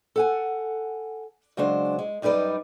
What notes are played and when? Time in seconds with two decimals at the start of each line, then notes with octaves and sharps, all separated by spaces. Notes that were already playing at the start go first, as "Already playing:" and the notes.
0.16 A4 F#5 G#5
1.57 C#3 F#3 G#3 D4 C5
1.99 G#3
2.22 F#2 G3 D#4 B4 D5